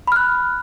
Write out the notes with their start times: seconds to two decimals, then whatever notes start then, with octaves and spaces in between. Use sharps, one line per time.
0.07 B5
0.12 F6
0.16 F#6